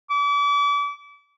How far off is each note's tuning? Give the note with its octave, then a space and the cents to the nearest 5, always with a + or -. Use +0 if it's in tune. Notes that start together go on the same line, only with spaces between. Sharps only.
D6 -35